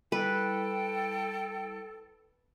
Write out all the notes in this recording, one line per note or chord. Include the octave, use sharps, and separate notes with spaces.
G3 E4 A4 B4 G5